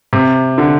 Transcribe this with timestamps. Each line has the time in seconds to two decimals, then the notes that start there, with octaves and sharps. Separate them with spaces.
0.13 C3
0.58 D3